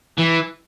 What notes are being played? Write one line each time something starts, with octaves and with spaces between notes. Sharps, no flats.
E3